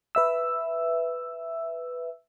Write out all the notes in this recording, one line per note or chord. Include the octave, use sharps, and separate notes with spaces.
B4 E5 E6